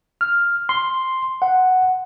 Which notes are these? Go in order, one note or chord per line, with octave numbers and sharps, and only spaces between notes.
F6
C6
F#5